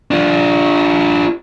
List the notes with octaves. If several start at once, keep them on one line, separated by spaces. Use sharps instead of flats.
D4 F4